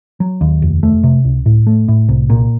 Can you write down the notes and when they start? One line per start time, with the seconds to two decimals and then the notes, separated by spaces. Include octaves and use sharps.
0.20 F#3
0.41 D#2
0.62 F1
0.83 A3
1.04 C3
1.25 C#2
1.46 A2
1.67 A3
1.88 A2
2.09 C2
2.30 A#2